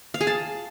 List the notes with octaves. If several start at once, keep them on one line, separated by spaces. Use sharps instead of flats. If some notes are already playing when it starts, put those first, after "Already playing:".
F5
G#4
A5